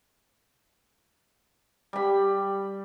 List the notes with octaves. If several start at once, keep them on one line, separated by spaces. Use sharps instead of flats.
G3 B5